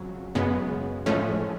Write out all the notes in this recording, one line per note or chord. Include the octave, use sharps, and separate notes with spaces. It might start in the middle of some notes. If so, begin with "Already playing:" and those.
Already playing: F2 C#3 F#3
F#2 C#3 G#3 B3
A2 F3 G#3 A3 C#4